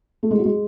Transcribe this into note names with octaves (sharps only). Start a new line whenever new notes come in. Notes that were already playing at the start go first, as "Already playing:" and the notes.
A3
G#3
F#3
G#3